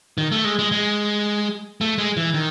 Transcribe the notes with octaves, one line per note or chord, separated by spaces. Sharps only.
D#3
A3
G#3
G#3
G#3
A3
G#3
E3
D#3